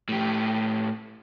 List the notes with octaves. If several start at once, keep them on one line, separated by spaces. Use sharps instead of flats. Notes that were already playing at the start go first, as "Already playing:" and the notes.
A2 G4